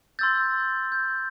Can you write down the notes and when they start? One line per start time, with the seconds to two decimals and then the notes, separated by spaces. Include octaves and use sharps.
0.19 C6 E6 G6 A6
0.92 G6